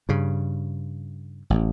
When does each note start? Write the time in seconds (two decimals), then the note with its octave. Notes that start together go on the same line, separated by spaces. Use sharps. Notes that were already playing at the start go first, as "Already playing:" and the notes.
0.09 G2 C#3
1.50 A1